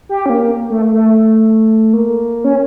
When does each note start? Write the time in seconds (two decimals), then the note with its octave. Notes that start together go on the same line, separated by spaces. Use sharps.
0.09 G4
0.26 C#4
0.29 A#3
0.70 A3
0.93 A3
1.93 A#3
2.44 C#4